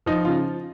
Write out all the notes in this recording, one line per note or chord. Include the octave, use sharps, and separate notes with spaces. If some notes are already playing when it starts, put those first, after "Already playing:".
F3 D#4
C#3 F4